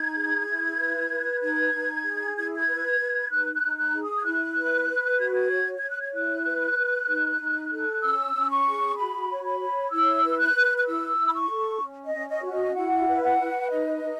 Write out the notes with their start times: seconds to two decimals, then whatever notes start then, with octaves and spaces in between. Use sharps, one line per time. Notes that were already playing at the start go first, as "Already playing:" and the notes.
Already playing: D#4 G#6
0.15 G#4
0.47 E4
0.78 B4
1.10 B4
1.41 D#4 G#6
1.73 D#4
2.04 G#4
2.36 E4 G#6
2.55 G#6
2.67 B4
3.00 B4
3.30 D#4 F#6
3.54 F#6
3.62 D#4
3.78 F#6
3.94 G#4
4.01 D#6
4.19 G#6
4.24 E4 F#6
4.56 B4
4.88 B4
5.19 F#4 G#6
5.34 G#6
5.51 C#5
5.78 C#5 G#6
5.90 F#6
6.01 G#6
6.13 E4 F#6
6.45 B4
6.77 B4
7.08 D#4
7.41 D#4
7.71 A4
8.03 C#4 E6
8.34 C#4
8.50 C#6
8.67 G#4
8.97 F#4 B5
9.30 C#5
9.44 B5
9.60 C#5
9.91 E4 E6
10.23 B4
10.39 F#6
10.54 B4
10.77 F#6
10.86 E4 E6
11.18 E4
11.29 B5
11.33 C#6
11.49 A4
11.81 C#4
12.05 D#5
12.13 C#4
12.28 D#5
12.44 F#4
12.51 D#5
12.75 E4 F#5
13.07 B4
13.23 F#5
13.39 B4
13.70 D#4 D#5
14.02 D#4